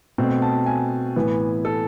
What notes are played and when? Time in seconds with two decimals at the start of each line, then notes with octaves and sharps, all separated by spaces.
0.18 B2 A3 C4
0.42 A5
0.66 G#5
1.16 A2 E3 B3
1.65 A4